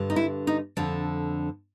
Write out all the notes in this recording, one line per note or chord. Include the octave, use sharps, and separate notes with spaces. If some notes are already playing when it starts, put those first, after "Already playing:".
Already playing: G2 D3
D#4
E4
D#4
F2 D3 D4